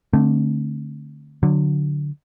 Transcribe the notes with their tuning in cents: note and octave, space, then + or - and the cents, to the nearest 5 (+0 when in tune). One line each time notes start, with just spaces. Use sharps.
D3 +0 A3 +0 C4 +20
D3 +0 F#3 -20